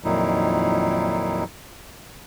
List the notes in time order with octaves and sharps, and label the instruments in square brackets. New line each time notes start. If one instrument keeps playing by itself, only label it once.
[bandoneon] F2 A#2 D#3 F#3 D#4 E4